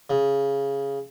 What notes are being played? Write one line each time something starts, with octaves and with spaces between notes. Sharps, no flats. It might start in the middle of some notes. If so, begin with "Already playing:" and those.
C#3